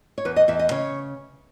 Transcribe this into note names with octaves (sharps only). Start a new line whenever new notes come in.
C#5
E2 B4
D#5
E2 E5
D#5
C#3 C#5